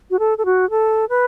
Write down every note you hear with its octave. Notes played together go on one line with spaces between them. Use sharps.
F#4
A4
A4
F#4
A4
B4